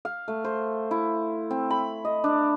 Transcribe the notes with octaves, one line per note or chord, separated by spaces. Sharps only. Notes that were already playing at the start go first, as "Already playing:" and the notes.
F5
A3
C5
E4
C4
B5
D#5
D4